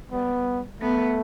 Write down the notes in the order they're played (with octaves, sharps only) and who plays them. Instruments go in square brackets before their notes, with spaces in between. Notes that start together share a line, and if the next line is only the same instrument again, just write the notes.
[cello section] G3 [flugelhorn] B3
[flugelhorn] A3 [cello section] B3